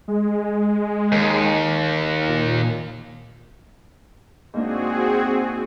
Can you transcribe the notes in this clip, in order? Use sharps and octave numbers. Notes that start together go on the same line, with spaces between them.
G#3
D#2
A#2
G#2 A#3 C4 D4 F#4 G#4